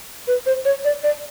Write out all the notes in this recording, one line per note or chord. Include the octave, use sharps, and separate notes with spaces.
B4
C5
C#5
D5
D5